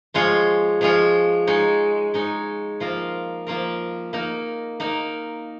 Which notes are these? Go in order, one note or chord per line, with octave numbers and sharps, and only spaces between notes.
F3 G#3 F4 C#5
F3 G#3 F4 C#5
G#3 D#4 C#5
G#3 D#4 C#5
F3 A#3 F4 A#4
F3 A#3 F4 A#4
A#3 D#4 A#4
A#3 D#4 A#4